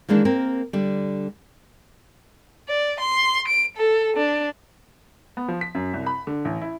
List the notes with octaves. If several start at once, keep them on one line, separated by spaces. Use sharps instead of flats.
D#3 E3 G#3 A#3 D4
A#3 C4 A#4
D3 G3
D5
C6
D7
A4
D4
B3
F3
B6
F#2
C2
B5
D3
A1
E4